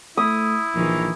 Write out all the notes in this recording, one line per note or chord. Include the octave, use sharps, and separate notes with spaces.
A3 E4 D#6
A#1 D#3 E3